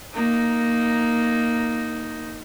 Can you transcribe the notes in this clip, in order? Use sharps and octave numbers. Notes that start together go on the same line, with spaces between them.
A#3 D#4